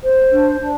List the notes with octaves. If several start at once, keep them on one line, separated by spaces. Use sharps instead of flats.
C5
D4
D4